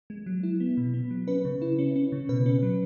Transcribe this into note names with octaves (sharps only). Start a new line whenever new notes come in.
G#3
F#3
E4
B3
B2
B3
F#3
C#4 B4
C#3
E4
C#4
C#4
C#3
B2 B4
C#4
F#3